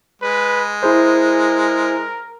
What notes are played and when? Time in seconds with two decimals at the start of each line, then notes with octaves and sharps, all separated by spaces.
0.22 G#3 B4
0.83 E4 G#4 A#4 C5